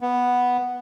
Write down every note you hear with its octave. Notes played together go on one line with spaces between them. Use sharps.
B3